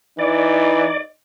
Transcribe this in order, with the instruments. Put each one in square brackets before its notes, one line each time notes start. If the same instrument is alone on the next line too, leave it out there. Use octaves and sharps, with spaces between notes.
[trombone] E3 [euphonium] D#4 [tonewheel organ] D5